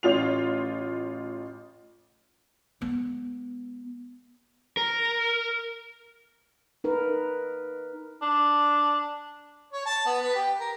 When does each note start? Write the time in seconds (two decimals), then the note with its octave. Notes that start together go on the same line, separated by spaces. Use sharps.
0.03 A1 F4 F7
2.81 G#3 B3
4.77 A#4
6.84 D#4 A#4 B4
8.22 D4
9.73 C#5
9.86 A5
10.06 B3
10.23 B4
10.35 G4
10.60 A#4